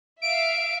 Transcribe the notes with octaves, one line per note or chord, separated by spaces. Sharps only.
E5 F5 D7